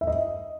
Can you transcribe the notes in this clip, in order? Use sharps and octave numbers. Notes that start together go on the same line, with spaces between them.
E5
D#5